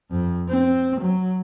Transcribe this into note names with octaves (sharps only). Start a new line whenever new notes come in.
F2
C4
F#3